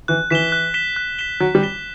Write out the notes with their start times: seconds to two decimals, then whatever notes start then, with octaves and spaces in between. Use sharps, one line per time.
0.08 E3 F#6
0.30 E3 B6 E7 G7
0.52 F#6
0.74 B6 E7 G7
0.96 F#6
1.19 B6 E7 G7
1.40 F#3 F#6
1.55 G3
1.63 B6 E7 G7